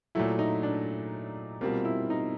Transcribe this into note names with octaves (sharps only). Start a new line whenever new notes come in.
A#2 F#3 A3 E4
D#4
D4
B2 G3 A#3 C4 F4
E4
D#4